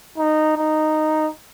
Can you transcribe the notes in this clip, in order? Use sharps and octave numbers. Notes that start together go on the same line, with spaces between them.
D#4
D#4